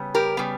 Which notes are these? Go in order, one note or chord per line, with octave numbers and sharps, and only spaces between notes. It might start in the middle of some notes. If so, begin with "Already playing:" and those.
Already playing: C#3 G3 B3
G4 A#4
C#3 G3 B3